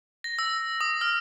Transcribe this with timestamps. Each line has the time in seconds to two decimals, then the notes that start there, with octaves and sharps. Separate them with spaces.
0.24 A#6
0.39 E6
0.81 D#6
1.01 F6